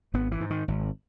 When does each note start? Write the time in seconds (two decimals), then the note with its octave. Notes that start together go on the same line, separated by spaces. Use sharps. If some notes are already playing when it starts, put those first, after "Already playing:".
0.14 G#1 B3
0.32 E3
0.40 G#2
0.50 D#3
0.68 G#1